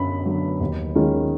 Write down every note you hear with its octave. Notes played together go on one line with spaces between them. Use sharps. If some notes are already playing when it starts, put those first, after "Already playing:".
Already playing: F#2 D3 F#3 B5
D3 F#3
D#2
D#3 G#3 C#4 F4